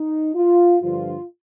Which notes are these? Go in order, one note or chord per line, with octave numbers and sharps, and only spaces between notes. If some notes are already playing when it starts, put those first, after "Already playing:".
Already playing: D#4
F4
G2 D3 F3 F4